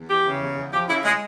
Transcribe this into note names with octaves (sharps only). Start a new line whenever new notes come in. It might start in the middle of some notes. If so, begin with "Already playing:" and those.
Already playing: E2
E3 G4
C#3
E2
E2
F3 G4
C#3 E4
G#3